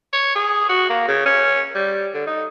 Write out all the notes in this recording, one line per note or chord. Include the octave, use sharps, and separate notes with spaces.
C#5
G#4
F#4
A#3
C#3
C#4
G3
D3
D#4